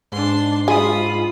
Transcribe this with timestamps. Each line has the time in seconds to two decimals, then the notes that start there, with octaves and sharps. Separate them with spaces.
0.12 G#2 D4 C6
0.68 F4 G#4 B5 D#6